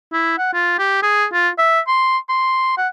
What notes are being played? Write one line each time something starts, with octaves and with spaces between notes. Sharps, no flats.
E4
F#5
F4
G4
G#4
F4
E5
C6
C6
F#5